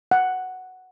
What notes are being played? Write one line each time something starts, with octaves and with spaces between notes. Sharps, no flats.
F#5